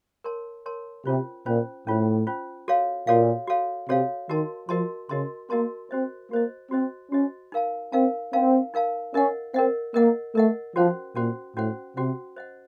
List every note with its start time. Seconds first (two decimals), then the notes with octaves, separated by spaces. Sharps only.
0.24 A#4 C#5 A5 C6
0.66 A#4 C#5 A5 C6
1.05 C3 C#4 F4 C5
1.46 A#2 C#4 F4 C5
1.86 A2 C#4 F4 C5
2.27 C#4 F4 C5
2.68 F#4 A4 C#5 F5
3.07 A#2 F#4 A4 C#5 F5
3.48 F#4 A4 C#5 F5
3.89 C3 F#4 A4 C#5 F5
4.29 D#3 F#4 A#4 D#5 A5 C6
4.69 F3 F#4 A#4 D#5 A5 C6
5.09 C#3 F#4 A#4 D#5 A5 C6
5.50 A#3 F#4 A#4 D#5 A5 C6
5.91 C4 F#4 C5 D#5
6.31 A#3 F#4 C5 D#5
6.71 C4 F#4 C5 D#5
7.11 C#4 F#4 C5 D#5
7.52 D#4 A#4 F5 A5
7.92 C4 D#4 A#4 F5 A5
8.33 C4 D#4 A#4 F5 A5
8.74 D#4 A#4 F5 A5
9.14 C#4 A#4 D#5 F#5
9.54 C4 A#4 D#5 F#5
9.94 A#3 A#4 D#5 F#5
10.35 A3 A#4 D#5 F#5
10.75 F3 C#4 F#4 C5 F#5
11.15 A#2 C#4 F#4 C5 F#5
11.56 A2 C#4 F#4 C5 F#5
11.97 C3 C#4 F#4 C5 F#5
12.37 C5 D#5 F#5